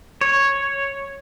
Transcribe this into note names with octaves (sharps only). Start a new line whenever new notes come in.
C#5